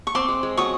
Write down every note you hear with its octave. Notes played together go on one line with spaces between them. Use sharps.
C#6
C4 C6 D6
G#3
G#3
F#3 C#6 D#6